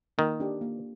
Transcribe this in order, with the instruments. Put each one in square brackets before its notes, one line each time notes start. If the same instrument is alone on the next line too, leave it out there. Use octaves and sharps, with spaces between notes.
[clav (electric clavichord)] D#3 [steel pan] A#3
[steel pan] D4 G4
A#3